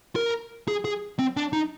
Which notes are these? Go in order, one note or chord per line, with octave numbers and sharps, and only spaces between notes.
A#4
G#4
G#4
C4
D4
D#4